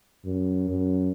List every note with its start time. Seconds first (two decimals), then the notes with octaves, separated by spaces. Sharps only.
0.25 F#2
0.69 F#2